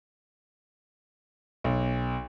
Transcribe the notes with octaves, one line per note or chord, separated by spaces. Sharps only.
B1